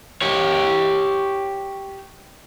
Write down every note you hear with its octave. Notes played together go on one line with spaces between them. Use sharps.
G4 C#5